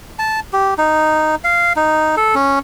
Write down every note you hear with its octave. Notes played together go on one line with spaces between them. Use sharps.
A5
G4
D#4
F5
D#4
A4
C#4